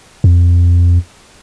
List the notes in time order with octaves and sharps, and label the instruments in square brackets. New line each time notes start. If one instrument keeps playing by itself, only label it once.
[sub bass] F2